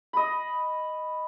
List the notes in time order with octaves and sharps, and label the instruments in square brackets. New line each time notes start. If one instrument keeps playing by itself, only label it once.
[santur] D#5 B5